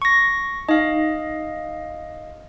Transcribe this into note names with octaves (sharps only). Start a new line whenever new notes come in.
C#6 A#6
D#4 D#5 F5